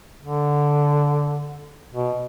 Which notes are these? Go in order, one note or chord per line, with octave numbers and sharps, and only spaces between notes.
D3
B2